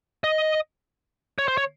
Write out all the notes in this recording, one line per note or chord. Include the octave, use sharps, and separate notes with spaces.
D#5
C#5
C5
C#5